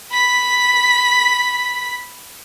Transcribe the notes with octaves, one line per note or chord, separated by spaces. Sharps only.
B5 B6